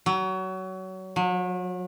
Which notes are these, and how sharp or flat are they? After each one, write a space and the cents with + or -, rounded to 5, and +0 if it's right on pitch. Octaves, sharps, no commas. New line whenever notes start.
F#3 +25
F#3 -35